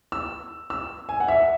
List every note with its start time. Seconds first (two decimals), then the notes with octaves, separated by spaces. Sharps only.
0.12 E6
0.70 E6
1.09 G#5
1.20 F#5
1.28 E5